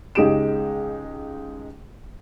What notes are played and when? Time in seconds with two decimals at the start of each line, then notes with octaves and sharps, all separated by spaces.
0.15 C#2 G#3 D#4 G4 D7 E7